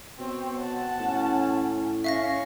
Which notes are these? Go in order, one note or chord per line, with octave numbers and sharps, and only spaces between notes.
B2 C4 C#5
F#5 A5
A2 C#4
C#4 E5 F5 C#6 A#6